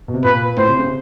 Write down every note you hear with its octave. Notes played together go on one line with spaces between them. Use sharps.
B2
C3
A#2 B4
A2 C5
C3
C#3
C3